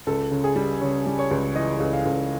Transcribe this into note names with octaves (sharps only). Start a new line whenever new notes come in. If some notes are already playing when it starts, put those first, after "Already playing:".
C#2 A4
C#3
G#4
G3
C#3 C#5
G3
C#5
C#2
E3 D#5
C#2
F5
C#2